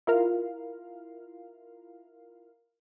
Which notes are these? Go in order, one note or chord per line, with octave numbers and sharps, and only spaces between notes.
E4 F4 A#4 F5